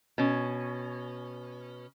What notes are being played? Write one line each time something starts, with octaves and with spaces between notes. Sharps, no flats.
B2 C#4